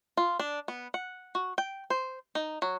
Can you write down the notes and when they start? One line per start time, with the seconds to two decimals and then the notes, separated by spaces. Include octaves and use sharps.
0.17 F4
0.39 D4
0.68 B3
0.94 F#5
1.35 F#4
1.58 G5
1.90 C5
2.35 D#4
2.62 F#3